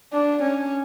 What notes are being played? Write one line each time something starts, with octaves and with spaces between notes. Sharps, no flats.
D4
C#4